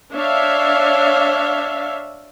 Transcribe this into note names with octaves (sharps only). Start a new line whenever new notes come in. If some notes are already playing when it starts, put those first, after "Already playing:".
D4 C#5 E5 F5